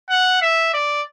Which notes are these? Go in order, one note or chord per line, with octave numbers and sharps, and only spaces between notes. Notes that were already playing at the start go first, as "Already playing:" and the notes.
F#5
E5
D5